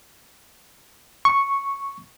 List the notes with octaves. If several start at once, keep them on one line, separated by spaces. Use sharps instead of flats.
C#6